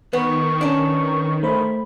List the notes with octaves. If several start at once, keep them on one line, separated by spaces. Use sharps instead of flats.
D#3 B3 B4 C#6
C#4 D4
A3 C5 B5